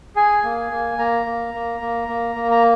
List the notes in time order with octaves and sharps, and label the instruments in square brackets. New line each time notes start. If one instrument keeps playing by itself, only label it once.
[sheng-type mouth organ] G#4 G#5
A#3
A#3
A#3 A#5
A#3
A#3
A#3
A#3
A#3
A#5